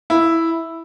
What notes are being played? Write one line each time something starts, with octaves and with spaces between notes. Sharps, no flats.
E4